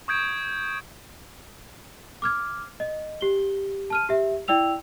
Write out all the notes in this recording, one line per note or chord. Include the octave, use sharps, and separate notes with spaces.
C#6 D#6 G6 G#6 D7
D6 F6 G#6
D#5
G4 G7
A5 F6 D#7
G4 E5
E4 D5 G5 E6 F7